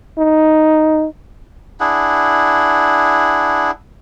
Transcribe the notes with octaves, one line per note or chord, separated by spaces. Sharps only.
D#4
D4 E4 G#4 F#5